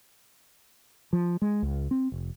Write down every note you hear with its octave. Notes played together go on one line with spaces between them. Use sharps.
F3
G#3
C#2
C4
F1